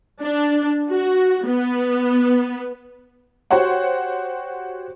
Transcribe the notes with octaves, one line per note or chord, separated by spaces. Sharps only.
D4
F#4
B3
F#4 G4 C5 C#5 F#5